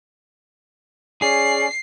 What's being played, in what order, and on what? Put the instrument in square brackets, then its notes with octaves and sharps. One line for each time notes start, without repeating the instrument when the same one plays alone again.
[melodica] C#4 D5 [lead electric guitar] G#4 [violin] C7